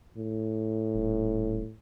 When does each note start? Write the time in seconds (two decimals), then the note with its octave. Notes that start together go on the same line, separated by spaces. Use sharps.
0.17 A2
0.94 D#1